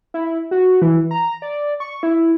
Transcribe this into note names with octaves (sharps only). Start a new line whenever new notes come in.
E4
F#4
E3
A#5
D5
C#6
E4